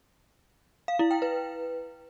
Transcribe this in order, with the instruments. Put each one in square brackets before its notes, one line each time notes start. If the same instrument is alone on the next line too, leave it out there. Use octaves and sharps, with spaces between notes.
[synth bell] F5
E4
G5
B4